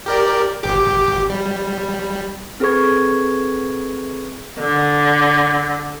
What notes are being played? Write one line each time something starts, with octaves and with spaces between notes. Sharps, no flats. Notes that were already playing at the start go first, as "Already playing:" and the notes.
G4 A#4 D5
G#1 G4 D6
G3
C4 G#4 A4 B4 C#6 G#6
D3